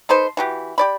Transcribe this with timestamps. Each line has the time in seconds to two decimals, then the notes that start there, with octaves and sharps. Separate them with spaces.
0.09 D#4 A4 B4 C5
0.37 E3 F#4 G4
0.78 G4 D5 B5